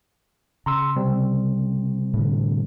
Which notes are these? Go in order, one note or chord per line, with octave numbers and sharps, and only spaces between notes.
C#3 A#5 C6 E6
C3 G3 C4
A2 D3